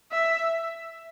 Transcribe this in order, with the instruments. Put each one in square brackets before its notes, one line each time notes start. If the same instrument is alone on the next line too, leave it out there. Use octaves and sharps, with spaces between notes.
[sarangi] E5